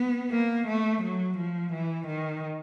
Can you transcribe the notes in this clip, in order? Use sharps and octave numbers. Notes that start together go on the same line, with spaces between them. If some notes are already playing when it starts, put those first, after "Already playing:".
Already playing: B3
A#3
A3
F#3
F3
E3
D#3